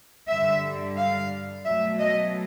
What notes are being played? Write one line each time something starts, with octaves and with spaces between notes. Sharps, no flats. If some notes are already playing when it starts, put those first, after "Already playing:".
G2 D3 G3 E5
F5
B2 F#3 A3 E5
D#5